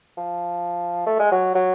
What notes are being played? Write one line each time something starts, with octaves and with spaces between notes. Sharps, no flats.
F3
A3
G#3
F#3
F#3